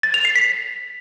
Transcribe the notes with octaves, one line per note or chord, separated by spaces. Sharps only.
A6
F7
C7
B6